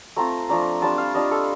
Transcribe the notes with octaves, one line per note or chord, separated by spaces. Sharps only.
A3 C4 F4 A#5
F3 A3 D4 A#5
G3 D4 F4 A5
F5
G3 D4 F4 D#5
A4